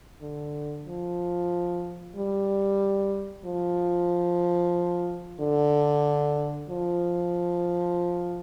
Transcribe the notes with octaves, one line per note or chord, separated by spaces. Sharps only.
D3
F3
G3
F3
D3
F3